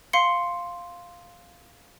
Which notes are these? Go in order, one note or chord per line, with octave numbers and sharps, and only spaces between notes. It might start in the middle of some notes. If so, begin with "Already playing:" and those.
F5 C6 C#7